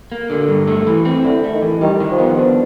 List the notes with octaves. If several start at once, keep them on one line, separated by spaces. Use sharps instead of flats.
A#3
D3
G2
A3
E3
C4
D3 E4
A3
D#3
E3
D#3 G3
D#3
F3
B3
D4